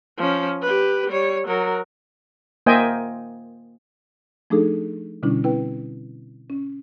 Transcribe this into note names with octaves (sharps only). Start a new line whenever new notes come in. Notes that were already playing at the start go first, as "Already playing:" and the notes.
F3 C#4
G4 B4
G3 C#5
F#3 A#4
A#3 C5 D#5 E5 G5 G#5
F3 A3 D4 D#4 G#4 A4
B2 D3 G3 C#4 D4 E4
C4 E4 B4 G5
C#4